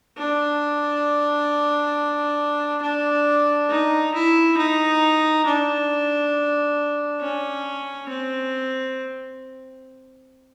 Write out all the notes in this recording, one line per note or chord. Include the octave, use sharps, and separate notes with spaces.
D4
D4
D#4
E4
D#4
D4
C#4
C4